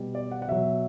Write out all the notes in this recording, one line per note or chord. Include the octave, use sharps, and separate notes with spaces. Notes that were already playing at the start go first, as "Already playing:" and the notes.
Already playing: B2 G3
D5
F#5
F#5
B2 F#3 E5